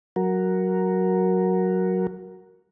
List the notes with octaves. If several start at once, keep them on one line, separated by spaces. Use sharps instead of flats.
F#3 F#4 A#4